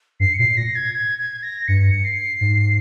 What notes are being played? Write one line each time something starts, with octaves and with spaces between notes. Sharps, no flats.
G2 C7
C#7
A#2 C7
A#2 A#6
G#6
G#6
G#6
A#6
G2 C#7
C#7
C7
G#2